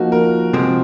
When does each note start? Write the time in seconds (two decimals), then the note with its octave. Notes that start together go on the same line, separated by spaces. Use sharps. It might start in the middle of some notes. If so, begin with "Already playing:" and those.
Already playing: F3 A#3 D#4 F#4
0.12 A#4
0.53 C3 F3 G#3 C4